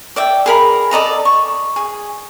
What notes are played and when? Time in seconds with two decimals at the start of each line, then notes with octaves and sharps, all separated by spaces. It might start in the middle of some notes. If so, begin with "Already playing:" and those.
0.16 D5 E5 G5
0.46 G#4 A#4 B5
0.91 A4 D5 D#5 A#5
1.25 C#6
1.76 G#4